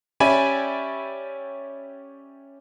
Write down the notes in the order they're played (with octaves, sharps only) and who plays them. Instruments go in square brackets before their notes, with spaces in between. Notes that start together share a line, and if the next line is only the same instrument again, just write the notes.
[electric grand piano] C#4 G4 D5 E5 G#5 B5